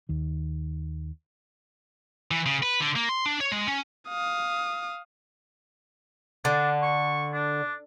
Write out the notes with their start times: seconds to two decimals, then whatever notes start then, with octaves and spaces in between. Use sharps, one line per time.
0.09 D#2 D#3
2.31 E3
2.46 C#3
2.63 B4
2.80 D3
2.96 A#3
3.09 C6
3.26 D4
3.40 C#5
3.52 G#3
3.67 C#4
4.09 F5 D#6
6.45 D3 D4
6.83 C#6
7.33 D4